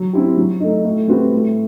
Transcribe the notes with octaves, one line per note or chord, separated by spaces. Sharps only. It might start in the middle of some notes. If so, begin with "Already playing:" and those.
Already playing: F#3
C4 E4 G4
F#3
A3 D#4
A2
G3 C4 F#4 B4
A2